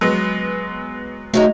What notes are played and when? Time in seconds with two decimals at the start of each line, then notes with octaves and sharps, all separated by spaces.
0.01 F#3 G#3 B3
1.34 F#3 G#3 A3 D#4